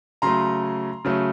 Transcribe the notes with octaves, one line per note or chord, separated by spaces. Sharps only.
C#3 F#3 A3 A#5 C6
C#3 F#3 A3